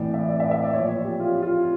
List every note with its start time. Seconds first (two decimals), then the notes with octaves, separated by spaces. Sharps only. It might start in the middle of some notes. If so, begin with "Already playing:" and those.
Already playing: A2 E3 D5
0.14 E5
0.29 D5
0.40 E5
0.51 E5
0.63 D5
0.73 A#2 F3 C#5
1.04 G4
1.20 F4
1.42 F4